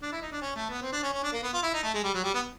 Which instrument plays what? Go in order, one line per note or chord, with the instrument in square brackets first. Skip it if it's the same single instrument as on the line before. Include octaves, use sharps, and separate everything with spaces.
[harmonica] D4
E4
D#4
D4
C#4
A3
B3
C4
D4
C#4
C#4
D4
A#3
B3
F4
E4
D#4
A3
G#3
G3
F#3
G3
B3